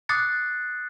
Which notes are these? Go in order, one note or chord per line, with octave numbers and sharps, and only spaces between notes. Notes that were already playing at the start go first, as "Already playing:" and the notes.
D6 D#6 F#6 A6 C7 C#7